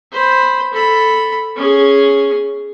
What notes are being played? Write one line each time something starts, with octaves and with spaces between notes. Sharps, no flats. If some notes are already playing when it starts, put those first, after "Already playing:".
C5 B5
A4 B5
C#4 G#4